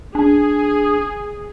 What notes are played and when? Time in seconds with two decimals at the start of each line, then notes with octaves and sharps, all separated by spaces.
0.15 D4 G#4